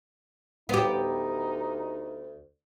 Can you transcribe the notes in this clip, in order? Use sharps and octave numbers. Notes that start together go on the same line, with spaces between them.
D2 B3 D#4 G4